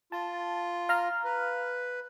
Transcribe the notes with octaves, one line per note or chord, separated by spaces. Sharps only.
F4 A5
F5 A#5 F6
B4